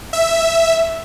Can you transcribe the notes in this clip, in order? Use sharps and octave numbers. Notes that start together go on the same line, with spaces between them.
E5